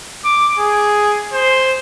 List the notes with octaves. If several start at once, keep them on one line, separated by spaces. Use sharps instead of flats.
D6
G#4
C5